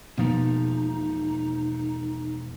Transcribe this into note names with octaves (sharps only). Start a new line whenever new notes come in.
E1 B2 F3 A#3 D#4